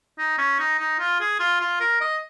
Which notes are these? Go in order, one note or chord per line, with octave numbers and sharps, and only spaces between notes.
D#4
C#4
D#4
D#4
F4
G#4
F4
F4
A#4
D#5